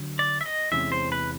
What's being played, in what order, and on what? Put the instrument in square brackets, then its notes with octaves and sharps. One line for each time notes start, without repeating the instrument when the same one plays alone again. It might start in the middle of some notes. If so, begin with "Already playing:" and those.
Already playing: [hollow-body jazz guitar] D3 F#3
[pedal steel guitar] D5
E5
D#5
[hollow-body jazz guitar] E2 C3 E3 G#3 C#4 [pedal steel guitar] E5
[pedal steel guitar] C5
B4